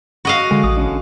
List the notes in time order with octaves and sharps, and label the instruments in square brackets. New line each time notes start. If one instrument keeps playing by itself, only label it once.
[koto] F#4 D#5 F5
[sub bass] D3 [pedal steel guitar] G#3
[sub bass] A1 [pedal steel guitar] D#6
[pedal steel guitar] D3 C#4 D4